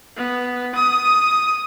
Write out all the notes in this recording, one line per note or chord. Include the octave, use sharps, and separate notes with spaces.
B3
D#6